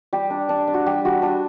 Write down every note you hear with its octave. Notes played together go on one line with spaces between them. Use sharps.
G3 G4
D4
D4
D4
F#4
G3 G4
G3 F#4
D4 F#4